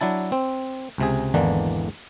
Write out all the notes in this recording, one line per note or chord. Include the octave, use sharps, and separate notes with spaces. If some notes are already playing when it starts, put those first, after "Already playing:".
F#3 D4 E4 A5
C4
C#2 C3 G#4
G#1 E2 D3 E3 A#3 D4